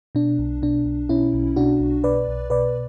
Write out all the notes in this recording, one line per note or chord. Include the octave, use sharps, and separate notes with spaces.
B2 D4
B1
B2 D4
B1
B2 C#4 E4
B1
B2 D4 F#4
B1
B2 B4 D5
B1
B2 B4 D5